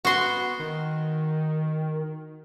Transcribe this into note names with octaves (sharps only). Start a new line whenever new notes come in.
B3 F#4 C6
D#3